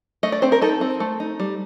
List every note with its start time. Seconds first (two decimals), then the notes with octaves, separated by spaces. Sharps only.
0.23 A3 D#5
0.32 D5
0.42 C4 C5
0.52 A#4
0.62 D#4 A4
0.81 C4
1.00 A3
1.20 D#4
1.40 G3